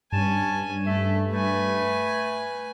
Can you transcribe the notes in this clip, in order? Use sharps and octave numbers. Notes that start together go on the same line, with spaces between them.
G2 C#4 G#5 A5
A3 A4 E5
A3 B4 G#5